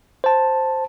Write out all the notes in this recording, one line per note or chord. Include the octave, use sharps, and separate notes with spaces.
C5 A5